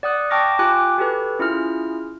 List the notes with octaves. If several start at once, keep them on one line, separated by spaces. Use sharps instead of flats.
D5 F#5 D#6 F#6
G5 A5 C#6 D6 F6 A#6
F4 G4 G5 G#5 D6 F#6
F#4 G4 A4 B4
C#4 E4 F4 G#4 F6